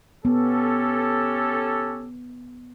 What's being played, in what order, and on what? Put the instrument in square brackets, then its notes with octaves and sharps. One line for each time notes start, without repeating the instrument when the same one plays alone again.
[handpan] B3 [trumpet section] C#4 G4 A4